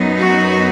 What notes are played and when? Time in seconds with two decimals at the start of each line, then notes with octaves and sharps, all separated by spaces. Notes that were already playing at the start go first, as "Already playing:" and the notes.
Already playing: F#2 F#3 B3 D#4
0.19 F#4